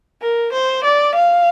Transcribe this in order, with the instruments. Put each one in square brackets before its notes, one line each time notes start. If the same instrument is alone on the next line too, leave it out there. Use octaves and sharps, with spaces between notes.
[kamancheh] A#4
C5
D5
F5